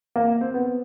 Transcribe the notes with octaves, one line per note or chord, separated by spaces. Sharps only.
A#3
C4
B3